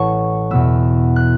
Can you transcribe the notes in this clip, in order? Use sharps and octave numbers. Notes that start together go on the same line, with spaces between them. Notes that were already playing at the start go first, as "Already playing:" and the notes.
Already playing: A1 A2 E3 B4 C#5 F#5 A5 C#6
E2 B2 B3 E6
F#6